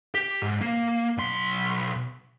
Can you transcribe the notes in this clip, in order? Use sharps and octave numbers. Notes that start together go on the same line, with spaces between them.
G4
G#2
A#3
B1 C6